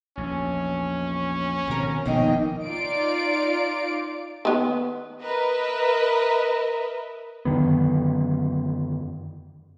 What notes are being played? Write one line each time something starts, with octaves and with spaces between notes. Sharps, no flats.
A#1 E2 C#4
D2 B2 D#3 C4 A#4
F1 A#1 B2 D#3 A#3 D#4 D#5 G5
D#4 F4 D5 D7
D#3 B3
A#4 B4 D#5 E5
F#2 D3 D#3 B3